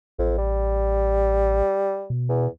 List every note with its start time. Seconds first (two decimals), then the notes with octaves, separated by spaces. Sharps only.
0.19 A1 F2
0.38 G3
2.10 B2
2.29 E2